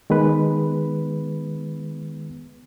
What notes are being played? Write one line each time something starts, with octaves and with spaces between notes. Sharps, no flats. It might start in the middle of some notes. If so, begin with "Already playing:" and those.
D#3 G#3 B3 B4